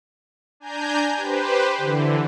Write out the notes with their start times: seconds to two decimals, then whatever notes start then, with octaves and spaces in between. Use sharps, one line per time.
0.60 D4 G#5 A#5 G6
1.17 G4 B4 C5
1.77 D3 E3